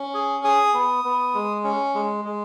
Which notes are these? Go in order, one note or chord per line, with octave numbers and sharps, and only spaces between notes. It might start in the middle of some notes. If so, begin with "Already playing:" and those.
Already playing: C#4
G#4
G#4 D#6
B3
B3
G#3
C#4
G#3
G#3